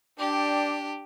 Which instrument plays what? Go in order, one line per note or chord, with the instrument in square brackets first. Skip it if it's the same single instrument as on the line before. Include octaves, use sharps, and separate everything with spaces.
[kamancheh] D4 [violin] G4 [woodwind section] D5 G5 D6